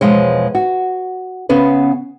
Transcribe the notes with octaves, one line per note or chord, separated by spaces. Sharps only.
E2 G#2 B2 F3 G#3 C#5
F#4
C#3 B3 C#4 B4